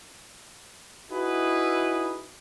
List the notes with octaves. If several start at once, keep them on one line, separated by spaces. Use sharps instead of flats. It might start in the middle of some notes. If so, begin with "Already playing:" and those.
D#4 E4 F#4 G#4 B4